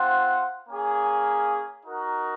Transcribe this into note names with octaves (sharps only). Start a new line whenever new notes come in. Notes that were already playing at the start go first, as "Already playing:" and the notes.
Already playing: C4 F4 C5 F#5
A#3 C#4 G#4
D#4 F#4 A#4